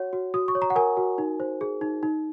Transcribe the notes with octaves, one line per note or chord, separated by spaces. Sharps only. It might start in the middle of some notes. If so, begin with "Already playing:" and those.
Already playing: F#4 C#5 F#5
F#4
F#4 D#6
C#6
C#5
A#5
F#5
A#4 G#5
F#4
D#4
C5
G#4
D#4
D#4